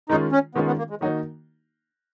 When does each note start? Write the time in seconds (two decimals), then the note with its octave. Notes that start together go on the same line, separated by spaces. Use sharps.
0.09 D#3 G#3 C#4 D#4 F4
0.32 C#4
0.55 D#3 G#3 B3 C#4 F4
0.67 B3
0.78 A#3
0.90 G#3
1.01 D#3 F#3 A#3 D#4 F#4